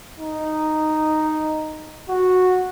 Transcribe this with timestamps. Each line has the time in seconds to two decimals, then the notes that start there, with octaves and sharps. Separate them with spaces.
0.20 D#4
2.09 F#4